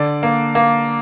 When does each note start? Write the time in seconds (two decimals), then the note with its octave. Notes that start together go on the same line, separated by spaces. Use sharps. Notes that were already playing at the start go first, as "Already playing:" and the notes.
Already playing: D3 D5
0.23 A#3
0.55 A#3